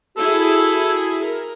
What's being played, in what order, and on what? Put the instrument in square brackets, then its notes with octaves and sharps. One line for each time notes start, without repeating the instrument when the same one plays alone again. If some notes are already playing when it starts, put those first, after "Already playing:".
[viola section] E4 G#4 [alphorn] F#4 [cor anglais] A4
[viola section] A#4